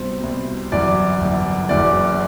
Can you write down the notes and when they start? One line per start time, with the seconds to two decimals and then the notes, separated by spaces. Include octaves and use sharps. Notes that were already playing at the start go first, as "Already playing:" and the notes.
Already playing: C2 B2 C5
0.23 C2 B2
0.72 G1 F#2 E3 D5
1.21 G1 F#2 E3
1.69 F#1 F#2 E3 D5